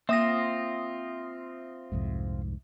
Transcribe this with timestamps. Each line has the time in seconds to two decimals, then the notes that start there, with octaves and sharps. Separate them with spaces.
0.09 A#3 C4 F4 E5 D#6 A#6
1.92 C2 F2 G#2